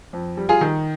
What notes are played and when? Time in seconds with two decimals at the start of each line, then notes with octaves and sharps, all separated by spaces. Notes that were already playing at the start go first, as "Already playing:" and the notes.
0.13 F2
0.37 G3
0.49 F4 G#4
0.61 D#3